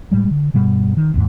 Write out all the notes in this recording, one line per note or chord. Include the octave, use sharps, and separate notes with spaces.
A2 G3 G#3
D3
G2 B2 G3
D#3
A1 D#2 G#2